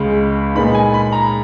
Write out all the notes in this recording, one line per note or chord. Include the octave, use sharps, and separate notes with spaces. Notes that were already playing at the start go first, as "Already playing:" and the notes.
Already playing: C#2 C#3 G#3
A#2 G#3 B3 D#4 B5
G#5
B5
A#5